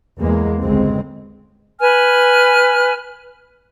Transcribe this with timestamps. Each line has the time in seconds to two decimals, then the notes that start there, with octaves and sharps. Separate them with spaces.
0.19 E2 G#3 A#3
0.60 G1 C#2 G#3 C4
1.80 B4 G#5 F6